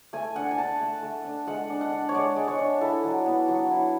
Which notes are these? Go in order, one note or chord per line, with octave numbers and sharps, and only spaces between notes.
A3 G#5
D4 F#5
G#5
D4 A5
A3
A3
D4
G#3 F#5
D4
F#5
D4
C#5
G#3 D5
G#3
C#5
D4
E4 A4
F#3
B3
F#3
E4